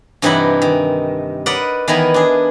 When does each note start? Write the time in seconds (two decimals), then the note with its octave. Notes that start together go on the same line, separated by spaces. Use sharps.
0.22 G2 C3 E3 D#4 E4 F#5
0.62 D#3
1.46 A#4 B4 D5 D#5 F#5
1.88 D#3 E3 B3 A#4 G#5
2.14 D4 G#4